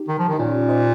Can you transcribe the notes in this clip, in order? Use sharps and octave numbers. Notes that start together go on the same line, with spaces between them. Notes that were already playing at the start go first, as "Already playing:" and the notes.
Already playing: D#4 G4
D#3
F3
D#3
D#4
A#2 C#4 F4
C5 D#5